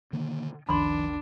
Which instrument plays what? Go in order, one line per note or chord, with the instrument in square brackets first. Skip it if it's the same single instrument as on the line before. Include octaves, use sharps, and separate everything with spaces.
[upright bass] B2 [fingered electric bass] D3 D#3 A#3
[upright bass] F#1 C#2 [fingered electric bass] D#3 F3 [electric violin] D4 [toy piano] B5 C6